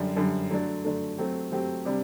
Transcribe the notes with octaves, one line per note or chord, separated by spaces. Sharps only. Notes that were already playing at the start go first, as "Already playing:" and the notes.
Already playing: F#2 D3 G3
F#2 D3 G3
D3 F#3 A3 D4
D3 F#3 A3 D4
F#3 A3 C4 G4
F#3 A3 C4 G4
C3 G3 D4